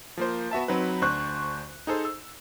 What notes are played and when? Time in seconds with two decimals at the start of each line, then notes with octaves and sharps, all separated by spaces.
0.17 F3 A#3 C5
0.51 B3 F#4 E5 A5
0.68 F#3 C4 D#4 B4
1.02 D2 D4 C5 C#6 F#6
1.87 D#4 G#4 A4 C5
2.05 E6